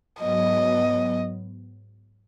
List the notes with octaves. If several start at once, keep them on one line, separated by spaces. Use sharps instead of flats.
G#2 F#3 B3 D#5